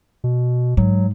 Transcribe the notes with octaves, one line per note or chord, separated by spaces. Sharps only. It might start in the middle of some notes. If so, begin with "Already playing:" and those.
B2
G#2 F#3